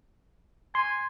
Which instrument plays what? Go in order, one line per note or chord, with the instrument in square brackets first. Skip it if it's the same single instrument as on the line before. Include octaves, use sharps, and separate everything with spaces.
[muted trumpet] G#5 [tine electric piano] C6